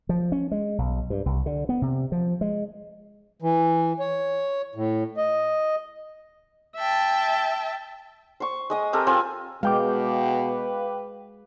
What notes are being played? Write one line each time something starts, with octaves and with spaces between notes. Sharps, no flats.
F3
C#4
G#3
B1
G2
C2
D3
B3
C3
F3
G#3
E3
C#5
A2
D#5
E5 G5 A5
C5 C#6
G#3 D#5 D#6
C4 G4 A4 A#4
C4 F4 C5 G#5
B2 G#3 B4 F5 G5 D6